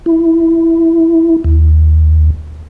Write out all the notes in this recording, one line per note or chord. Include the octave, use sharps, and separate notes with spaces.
E4
D#2